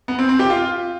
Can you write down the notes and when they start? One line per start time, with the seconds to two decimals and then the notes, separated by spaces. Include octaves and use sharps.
0.08 B3
0.19 C4
0.29 C4
0.39 G4
0.50 F4